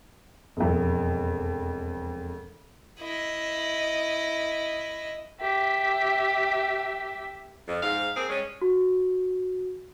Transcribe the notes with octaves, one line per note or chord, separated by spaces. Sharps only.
E1 F2
E4 D#5
G4 E5
F2
G#2 F5
A#3 C4 G#4
G3 G#3 C#4
F#4